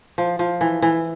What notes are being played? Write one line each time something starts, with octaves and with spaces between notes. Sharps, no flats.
F3
F3
E3
E3